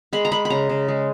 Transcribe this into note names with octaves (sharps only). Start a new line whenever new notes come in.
G#3 B5
A#5
G#3 B5
B5
C#3 A#5
C#3
G#3